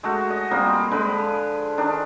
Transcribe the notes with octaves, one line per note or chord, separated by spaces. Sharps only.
G#3 A3 F#4
D#5
F3 G3 A#3 C4
D3 G#3 B4
D#3 D4